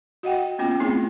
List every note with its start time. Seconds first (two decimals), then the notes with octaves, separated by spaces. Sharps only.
0.23 F#4 D#5 F#5 G5
0.59 A#3 B3 C#4 F4 G5
0.80 A3 B3 C4 E4 G#4